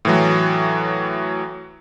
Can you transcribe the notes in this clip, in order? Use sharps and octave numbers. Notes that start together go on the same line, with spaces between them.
A2 E3 F#3